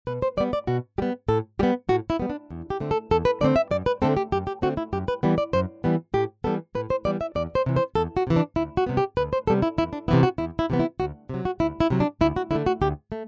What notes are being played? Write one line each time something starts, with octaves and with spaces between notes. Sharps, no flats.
B2 B4
C5
G3 B3 D5
D5
B2 F#4
G3 B3 G4
A2 A4
G3 B3 G4
A2 F#4
E4
G3 B3
D4
E2
G4
D3 A3 C4
A4
E2 A4
B4
D3 A3 C4 D5
E5
F#2 D5
B4
D3 A3 C4 A4
G4
F#2 G4
G4
D3 A3 C4 F#4
E4
F#2 G4
B4
E3 G3 B3
D5
F#2 C5
E3 G3 B3
A2 G4
E3 G3 B3 A4
A2 B4
C5
E3 G3 B3 D5
E5
E2 D5
C5
C3 E3
C5
E2 A4
F#4
C3 E3
D4
D2 E4
F#4
C3 G3 B3
G4
D2 B4
C5
C3 G3 B3 A4
E4
E2 E4
D4
C3 E3 B3 E4
F#4
E2 E4
E4
C3 E3 B3
E4
D2 F#4
C3 F#3
F#4
D2 E4
E4
C3 F#3
D4
D2 E4
F#4
D3 A3 E4
F#4
D2 G4
A3